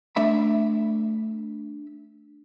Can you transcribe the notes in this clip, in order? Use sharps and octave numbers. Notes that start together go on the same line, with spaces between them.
A3 D4 E5 B5